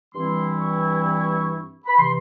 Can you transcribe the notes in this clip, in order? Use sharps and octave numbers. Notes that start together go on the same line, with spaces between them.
G2 E3 G3 C4 E4 C6
C#6
B5
C3 E3 C6